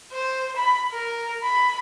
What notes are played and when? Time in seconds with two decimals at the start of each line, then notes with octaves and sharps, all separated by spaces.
0.13 C5
0.56 B5
0.92 A#4
1.43 B5